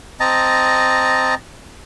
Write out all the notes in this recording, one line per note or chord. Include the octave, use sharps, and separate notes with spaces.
C4 D#5 A5 A#5